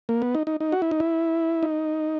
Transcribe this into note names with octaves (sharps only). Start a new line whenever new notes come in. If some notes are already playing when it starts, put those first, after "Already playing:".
A#3
B3
D#4
D#4
D#4
F#4
E4
D#4
E4
D#4